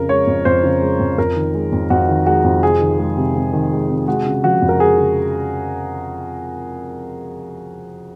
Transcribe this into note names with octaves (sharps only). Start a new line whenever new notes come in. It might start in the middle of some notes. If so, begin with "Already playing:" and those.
Already playing: F2 C#3 A#4
G#3 C#5
F2
F2 C5
C#3
G#3
F2
F2 A#4
D#3
G#3
F2
F2 F#4
D#3
G#3 F#4
F2
C3 G#4
D#3
G#3
C3
C3
D#3
G#3
C3
G#3 F#4
C#3
F3 F#4
F2
A#4
G#3 G#4
C#3